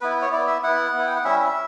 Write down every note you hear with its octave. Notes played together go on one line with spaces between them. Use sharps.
B3 E4 B4
C#5
B3 E4 D5
E5
B3 E4 F#5
B3 E4
G5
F#5
G3 C#4 E4 E5
E5